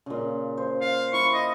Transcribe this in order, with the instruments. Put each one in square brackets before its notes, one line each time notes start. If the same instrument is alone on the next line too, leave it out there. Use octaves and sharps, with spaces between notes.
[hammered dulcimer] A#2 C#3
C5
[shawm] F5
[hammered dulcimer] E4 F5 [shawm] C#6
[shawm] D#5